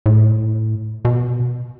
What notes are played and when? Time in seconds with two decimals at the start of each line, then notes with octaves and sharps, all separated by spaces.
0.06 A2
1.05 B2